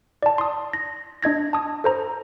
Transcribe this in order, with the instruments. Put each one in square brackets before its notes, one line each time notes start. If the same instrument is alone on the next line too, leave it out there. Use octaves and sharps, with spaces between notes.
[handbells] D5 A5
C6 D#6
A#6
D4 D#5 G#6 A#6
A5 D#6
A4 C5 A#5